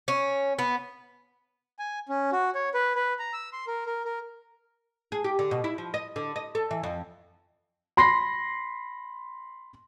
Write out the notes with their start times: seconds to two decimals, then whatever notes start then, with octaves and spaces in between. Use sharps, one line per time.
0.08 C#4
0.59 B3
1.79 G#5
2.09 C#4
2.32 F#4
2.55 C#5
2.74 B4
2.95 B4
3.19 A#5
3.33 E6
3.53 C6
3.67 A#4
3.86 A#4
4.05 A#4
5.12 G#4
5.24 G4
5.39 D3
5.51 B2
5.64 E4
5.78 F3
5.94 D#5
6.16 D3
6.36 D#5
6.55 A4
6.71 E3
6.83 F2
7.97 B5 C6 A#6 C7